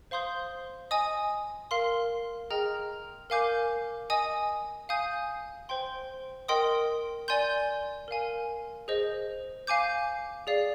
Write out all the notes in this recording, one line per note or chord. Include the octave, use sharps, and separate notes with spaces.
C5 F5 C6 D#6 G6
D#5 G#5 D#6
A#4 F5 C6
G#4 D#5 G5 A#5 F6
A#4 F5 G#5 D6 G6
D#5 G#5 D#6
F5 G#5 D#6 G6
C5 G5 C6
A#4 D#5 G5 C6 D#6
D5 G#5 C6 G6
A#4 F5 G#5
G#4 C5 D#5
F5 G#5 D6 G6
G#4 D5 F5